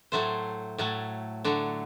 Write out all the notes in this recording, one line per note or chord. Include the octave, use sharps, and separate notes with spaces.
A2 F#3 A3 C5
A2 F#3 A3
D3 F#3 A3